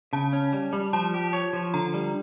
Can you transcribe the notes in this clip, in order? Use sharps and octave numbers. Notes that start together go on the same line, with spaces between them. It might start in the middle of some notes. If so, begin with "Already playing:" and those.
C#3 A5
C#4
G3
G3
F3 A5
G4
C#5
F3
D3 A#5
G3